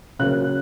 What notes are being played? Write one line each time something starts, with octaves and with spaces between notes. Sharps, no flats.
C#3 F#3 A#3 F#6